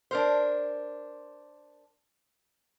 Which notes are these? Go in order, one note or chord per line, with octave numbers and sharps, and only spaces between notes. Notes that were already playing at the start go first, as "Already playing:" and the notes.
D4 A#4 C5